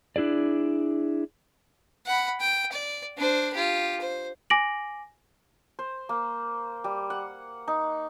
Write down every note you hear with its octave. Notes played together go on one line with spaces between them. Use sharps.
D4 E4 G#4 D5
F#5 B5
G5
D5
D4 C5
F4 G4
C5
G#5 D6 A#6 D7 F#7
C5
A#3
G3
F#5
D#4